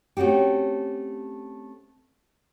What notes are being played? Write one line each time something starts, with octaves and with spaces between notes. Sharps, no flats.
A3 C4 C#4 F#4 G4